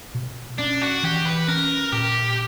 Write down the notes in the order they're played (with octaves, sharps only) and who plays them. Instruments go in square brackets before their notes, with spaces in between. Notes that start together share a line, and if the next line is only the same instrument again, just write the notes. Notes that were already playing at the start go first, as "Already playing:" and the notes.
[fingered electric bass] B2
[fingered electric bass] C#4 [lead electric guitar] D4
[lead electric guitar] F#4
[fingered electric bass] E3 [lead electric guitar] G4
[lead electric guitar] B4
[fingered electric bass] C#4 [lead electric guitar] A#4
[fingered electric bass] A#2 [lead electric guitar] G4